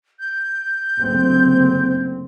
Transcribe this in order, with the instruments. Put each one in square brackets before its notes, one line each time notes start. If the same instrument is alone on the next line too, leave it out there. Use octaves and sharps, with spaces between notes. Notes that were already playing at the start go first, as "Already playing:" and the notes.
[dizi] G6
[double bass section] F#1 D2 C4